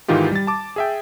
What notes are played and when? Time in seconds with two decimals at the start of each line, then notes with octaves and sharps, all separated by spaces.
0.08 G#2 D#3 E3 D#4 F4 G4
0.31 G3 A6
0.47 A5 D6
0.76 G#4 E5 G5